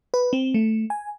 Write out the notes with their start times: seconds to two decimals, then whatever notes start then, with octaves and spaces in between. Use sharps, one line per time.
0.14 B4
0.33 C4
0.54 A3
0.90 G#5